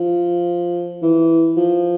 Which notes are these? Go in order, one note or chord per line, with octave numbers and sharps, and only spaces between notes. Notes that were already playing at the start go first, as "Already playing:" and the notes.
Already playing: F3
E3
F3